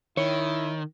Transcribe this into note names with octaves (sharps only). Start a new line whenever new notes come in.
D#3 E4 C#5